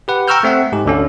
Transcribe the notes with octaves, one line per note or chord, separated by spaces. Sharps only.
G4 B4 F#5
G5 A#5 C#6 E6 F6 G6
A3 C4 E5 F#5
G#2 G4
D2 D3 C#4